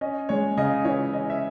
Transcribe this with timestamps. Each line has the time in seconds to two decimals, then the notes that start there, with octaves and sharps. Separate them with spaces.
0.01 C#4 D#5
0.29 G#3 C#5
0.57 C#3 D#5
0.84 E3 C#5
1.13 C#4 D#5
1.30 E5